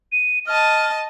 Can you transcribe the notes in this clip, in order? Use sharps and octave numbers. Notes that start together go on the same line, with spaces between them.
D#7
D#5 A5 F6